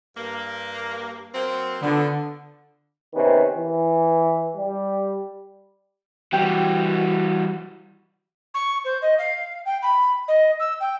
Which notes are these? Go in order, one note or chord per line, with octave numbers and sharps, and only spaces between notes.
G2 A#3
F#3 A#3 C4
D3 F3 B3
C3 D#3 B3 C#4
E3
G3
E3 G3 F#4 G4 G5
C#6
C5
D#5
F5
G5
B5
D#5
E6
G5